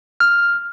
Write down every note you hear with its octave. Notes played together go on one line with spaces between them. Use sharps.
F6